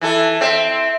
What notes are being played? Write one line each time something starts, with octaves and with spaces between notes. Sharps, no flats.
E3 E4 A4
C4 E5